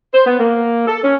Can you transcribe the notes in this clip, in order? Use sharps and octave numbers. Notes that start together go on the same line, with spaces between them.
C5
B3
A#3
A4
C#4